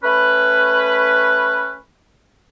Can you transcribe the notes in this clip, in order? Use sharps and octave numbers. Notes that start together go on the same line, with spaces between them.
A3 C#4 B4